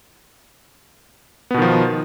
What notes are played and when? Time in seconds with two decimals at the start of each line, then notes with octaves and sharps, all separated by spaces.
1.51 B3
1.54 B2
1.58 D#3
1.62 F3